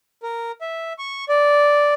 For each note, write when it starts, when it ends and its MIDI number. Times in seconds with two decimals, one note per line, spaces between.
0.23 0.52 70
0.61 0.93 76
0.99 1.25 85
1.29 1.94 74